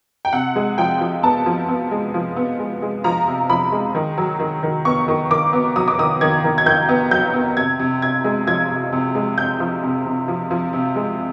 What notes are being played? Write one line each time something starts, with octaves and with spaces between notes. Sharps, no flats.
G5
C3 F#5
G#3
F3 G5
F3
B3 A5
F3
B3
G#3
F3
B3
G#3
G#3
F3 A#5
C3
F3 B5
G#3
D#3
F#3
D#3
D#3
B3 C#6
D#3
D#3 D6
B3
F#3 D#6
D6
D#3 D#6
D#3 G#6
D#3
G#6
D#3 G6
B3
F#3 G6
B3
C3 G#6
C3
C3 G#6
G#3
F3 G#6
C3
C3
G#3
C3 G6
F3
C3
C3
F3
F3
C3
G#3